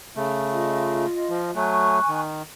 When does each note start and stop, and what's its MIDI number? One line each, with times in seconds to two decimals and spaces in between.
0.16 1.06 49
0.16 1.06 57
0.51 1.53 65
0.51 1.53 75
1.30 1.51 53
1.56 1.99 54
1.56 1.99 57
1.56 2.20 80
1.56 2.20 85
1.56 2.20 90
2.08 2.42 51